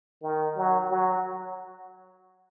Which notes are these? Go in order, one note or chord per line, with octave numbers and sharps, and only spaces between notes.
D#3
F#3
F#3